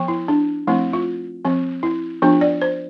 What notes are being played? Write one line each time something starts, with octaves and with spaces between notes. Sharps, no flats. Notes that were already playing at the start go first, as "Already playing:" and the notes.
Already playing: F3 B3
E4
D4
F3 A3 C4 E4
F4
F3 C4
E4
F3 B3 D4 F4
D5
C5